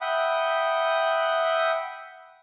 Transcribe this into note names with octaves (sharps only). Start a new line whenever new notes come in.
E5 F#5 G5 B5 D#6